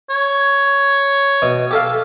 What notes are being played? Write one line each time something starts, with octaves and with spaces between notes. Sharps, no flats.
C#5
B2
G4 A4 F5